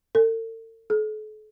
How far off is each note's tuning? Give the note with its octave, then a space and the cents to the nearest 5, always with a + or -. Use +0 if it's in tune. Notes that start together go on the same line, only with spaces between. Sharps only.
A4 +45
A4 -40